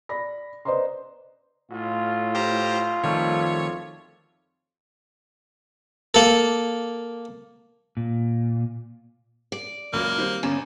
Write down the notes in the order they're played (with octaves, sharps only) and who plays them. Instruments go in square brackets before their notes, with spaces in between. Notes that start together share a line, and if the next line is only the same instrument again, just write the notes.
[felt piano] D5 B5 A#6
B4 C5 D5 D#5 A#5 C6
[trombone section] B1 F4 [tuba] A2
[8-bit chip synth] G4 C5 A#5
[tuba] F2 [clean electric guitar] D#3 G3 A3 [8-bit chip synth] C#5
[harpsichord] A#3 A4
[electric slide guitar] A#2
[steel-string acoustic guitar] D5
[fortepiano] C#2 F#2 F#3 [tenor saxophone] A#3
[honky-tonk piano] D#3 G3 C4
[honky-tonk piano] G1 E7 [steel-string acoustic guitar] C#3 [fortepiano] G#5 A#5 D6